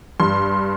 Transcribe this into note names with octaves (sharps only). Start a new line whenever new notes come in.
G2 C6